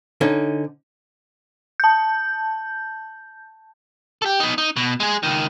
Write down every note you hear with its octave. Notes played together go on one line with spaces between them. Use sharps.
D3 C#4 D#4
A5 G6
G4 A4
B3 D#4
D#4
B2
G#3 G#4
C#2 D#3